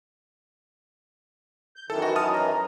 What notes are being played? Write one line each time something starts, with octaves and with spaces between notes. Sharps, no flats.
G6
F#2 D#3 E3 A4
F#4
A5 D#6 F6
A#5